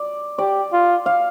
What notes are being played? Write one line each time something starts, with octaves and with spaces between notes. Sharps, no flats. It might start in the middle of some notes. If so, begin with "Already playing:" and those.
Already playing: D5
G4 D5
F4
F5